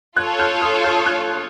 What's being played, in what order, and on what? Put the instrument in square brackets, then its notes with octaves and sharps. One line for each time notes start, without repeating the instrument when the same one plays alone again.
[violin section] F4 A4 C#5 [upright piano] F#6 G#6
[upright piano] F6 G6
D#6 F6
F6 G6
F#6 G#6